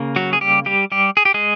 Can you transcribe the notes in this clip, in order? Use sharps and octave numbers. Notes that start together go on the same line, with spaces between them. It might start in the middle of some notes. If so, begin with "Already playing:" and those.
Already playing: C#3 A#3
F#3 F#4
G#4
G3 G4
G3 G4
G3 G4
G#4
G4
G#3 G#4